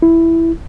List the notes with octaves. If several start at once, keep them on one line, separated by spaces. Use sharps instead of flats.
E4